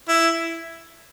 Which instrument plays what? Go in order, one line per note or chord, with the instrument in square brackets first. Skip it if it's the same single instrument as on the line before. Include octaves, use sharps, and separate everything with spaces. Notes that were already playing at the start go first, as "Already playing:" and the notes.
[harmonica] E4